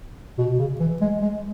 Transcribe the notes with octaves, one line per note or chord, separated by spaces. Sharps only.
B2
C#3
E3
G#3
G#3